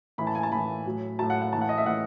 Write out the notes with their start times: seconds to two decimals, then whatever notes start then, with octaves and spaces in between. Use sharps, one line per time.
0.18 A2 E3 B5
0.27 A5
0.35 G#5
0.43 A5
0.52 A2 E3 B5
0.86 A2 F#3
1.19 A2 F#3 A5
1.30 F#5
1.42 F#5
1.53 A2 E3 A5
1.61 F#5
1.69 D#5
1.78 E5
1.86 A2 E3 F#5